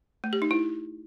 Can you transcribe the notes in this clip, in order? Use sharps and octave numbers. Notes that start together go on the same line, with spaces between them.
A3
G4
D#4
E4